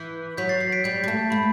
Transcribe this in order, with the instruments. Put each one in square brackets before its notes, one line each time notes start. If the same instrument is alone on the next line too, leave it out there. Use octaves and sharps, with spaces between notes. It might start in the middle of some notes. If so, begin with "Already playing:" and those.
Already playing: [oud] E3 [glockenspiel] G6 B6
[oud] F#3 [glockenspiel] G6 B6
[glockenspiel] A6 C7
A6 C7
B6 D7
[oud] G3 [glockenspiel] G6
[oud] G3
[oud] A3 [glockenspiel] A5
[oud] A3 [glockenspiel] B5